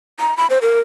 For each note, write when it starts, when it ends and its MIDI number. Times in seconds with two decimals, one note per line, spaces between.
0.20 0.37 82
0.37 0.47 83
0.50 0.59 72
0.62 0.81 70